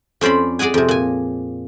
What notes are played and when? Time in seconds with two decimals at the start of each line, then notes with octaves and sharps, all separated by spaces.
0.21 F2 C#4 C5 D5 B5
0.59 G#4 D5 D#5 F#5 G#5
0.74 F2 C3
0.88 A#2 G#5